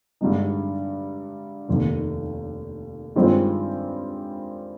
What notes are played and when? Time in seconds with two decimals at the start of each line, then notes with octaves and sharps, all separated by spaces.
0.21 G2 D3 G#3 D#4
1.68 F1 D#2 D#3
3.16 G2 D#3 G#3 C4 F4